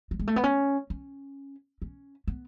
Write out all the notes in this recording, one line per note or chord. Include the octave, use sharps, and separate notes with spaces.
F#3
G#3
A3
B3
C#4
C#4
C#4
B3